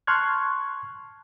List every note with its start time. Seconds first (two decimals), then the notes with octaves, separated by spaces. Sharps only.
0.07 A5 C6 C#6 F6 F#6 G#6